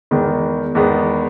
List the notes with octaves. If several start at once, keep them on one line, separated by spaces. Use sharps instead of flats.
E2 D#3 G#3 B3
E2 D#3 G#3 B3